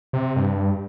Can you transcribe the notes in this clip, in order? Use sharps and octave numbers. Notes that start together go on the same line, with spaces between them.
C3
G2